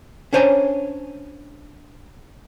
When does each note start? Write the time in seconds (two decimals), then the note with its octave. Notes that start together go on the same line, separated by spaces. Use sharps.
0.33 C#4 D4 C5 C#5 G#5 A#5